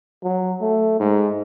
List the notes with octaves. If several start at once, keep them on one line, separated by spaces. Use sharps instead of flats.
F#3
A3
G#2